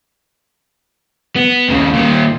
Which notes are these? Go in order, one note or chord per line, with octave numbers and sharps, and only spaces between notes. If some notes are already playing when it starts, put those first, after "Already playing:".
B3
D#2 C#3
A#2 D#3